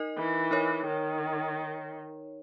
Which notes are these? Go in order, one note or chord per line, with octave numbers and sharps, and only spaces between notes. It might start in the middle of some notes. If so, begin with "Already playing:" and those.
Already playing: D#4 A#4 D#5
E3
D#4 A#4 C#5
D#3